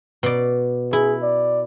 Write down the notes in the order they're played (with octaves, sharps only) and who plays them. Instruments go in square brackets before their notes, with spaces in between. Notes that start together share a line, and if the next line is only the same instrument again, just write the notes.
[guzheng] B2 D5
[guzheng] E4 [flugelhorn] G#4
[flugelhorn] D5